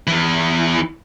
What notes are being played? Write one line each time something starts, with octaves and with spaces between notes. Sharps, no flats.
E2 E3